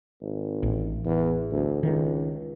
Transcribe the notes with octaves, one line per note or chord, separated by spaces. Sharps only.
G#1
A1
E2
D2
C#2 D#3